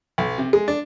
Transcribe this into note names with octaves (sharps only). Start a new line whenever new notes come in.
B1
C3
G#3
D4